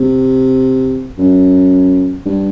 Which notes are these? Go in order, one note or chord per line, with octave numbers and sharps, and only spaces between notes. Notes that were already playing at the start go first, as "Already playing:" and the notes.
Already playing: C3
F#2
G2